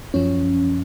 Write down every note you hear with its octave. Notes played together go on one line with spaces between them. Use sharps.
F#2 F3 C#4